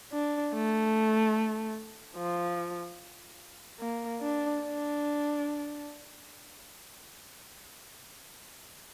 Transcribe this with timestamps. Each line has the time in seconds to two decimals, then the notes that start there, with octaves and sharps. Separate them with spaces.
0.12 D4
0.54 A3
2.17 F3
3.80 A#3
4.21 D4
4.62 D4